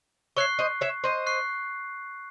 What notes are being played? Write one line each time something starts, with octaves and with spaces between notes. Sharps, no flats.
C#5 E5 C#6 F#6 C7
C5 D#5
C#5 E5
C5 D#5
C#6 F#6 C7